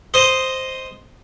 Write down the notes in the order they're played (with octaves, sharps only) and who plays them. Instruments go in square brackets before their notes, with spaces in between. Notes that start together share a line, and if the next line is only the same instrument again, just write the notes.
[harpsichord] C5 D#5